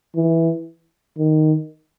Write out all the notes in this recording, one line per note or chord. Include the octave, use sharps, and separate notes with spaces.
E3
D#3